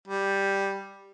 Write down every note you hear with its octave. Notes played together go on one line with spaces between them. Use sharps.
G3